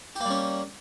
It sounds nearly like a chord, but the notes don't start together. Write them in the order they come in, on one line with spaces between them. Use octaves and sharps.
G4 A#3 G3 C#4